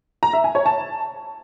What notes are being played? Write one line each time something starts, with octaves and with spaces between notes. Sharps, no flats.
A#5
E5
G#5
C#5
A5